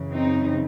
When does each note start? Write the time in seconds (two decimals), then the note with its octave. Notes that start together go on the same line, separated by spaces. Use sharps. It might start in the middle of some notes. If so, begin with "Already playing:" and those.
Already playing: F#2 C#3 E3
0.11 C4 D#4